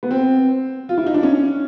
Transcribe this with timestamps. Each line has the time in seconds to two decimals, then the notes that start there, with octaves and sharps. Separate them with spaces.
0.03 B3
0.11 C4
0.89 F4
0.98 E4
1.07 D#4
1.14 D4
1.23 C#4